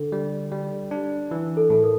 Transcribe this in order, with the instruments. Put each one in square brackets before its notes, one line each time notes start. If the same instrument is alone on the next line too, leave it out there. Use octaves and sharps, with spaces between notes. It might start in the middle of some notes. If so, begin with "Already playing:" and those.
Already playing: [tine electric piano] D3 [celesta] A4
[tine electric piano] G3
G3
D4
E3
[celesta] A4
[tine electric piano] A2 [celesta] A4
[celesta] A#4